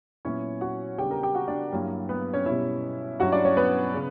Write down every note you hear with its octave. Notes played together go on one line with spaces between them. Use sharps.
A#2 F#3 B3 C#4 E4 C#5
F#4 F#5
C#3 G3 B3 D4 G4 G5
A#4 A#5
G4 G5
F#4 F#5
D4 D5
G2 F#3 A#3 E4
B3 B4
C#4 C#5
B2 G3 C#4 E4 E5
G2 F#3 C#4 E4 F#4 F#5
D4 D5
C#4 C#5
B3 B4
C#3